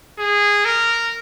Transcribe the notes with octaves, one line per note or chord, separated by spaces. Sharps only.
G#4
A#4